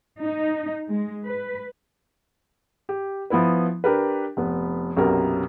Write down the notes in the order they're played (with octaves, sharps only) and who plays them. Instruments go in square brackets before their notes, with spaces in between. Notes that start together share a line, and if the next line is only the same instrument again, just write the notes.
[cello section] D#4
G#3
B4
[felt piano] G4
F3 B3 E4 B4
D4 G4 A#4 B4
F1 B3
B1 F#2 C3 B3 A#4